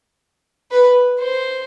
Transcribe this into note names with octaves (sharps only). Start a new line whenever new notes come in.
B4
C5